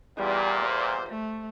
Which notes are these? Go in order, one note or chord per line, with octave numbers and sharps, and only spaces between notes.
E2 A#2 G3
C5
A3